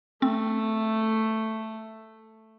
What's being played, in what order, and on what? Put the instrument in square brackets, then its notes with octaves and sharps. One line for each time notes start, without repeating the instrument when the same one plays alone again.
[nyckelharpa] A3 [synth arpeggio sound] C4